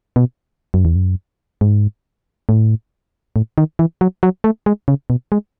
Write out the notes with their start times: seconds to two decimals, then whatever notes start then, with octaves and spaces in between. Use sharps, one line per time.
0.16 B2
0.74 F#2
0.85 E2
0.96 F#2
1.61 G#2
2.49 A2
3.36 A2
3.58 D#3
3.79 E3
4.01 F#3
4.23 F#3
4.44 A3
4.66 G#3
4.88 C#3
5.10 B2
5.32 G#3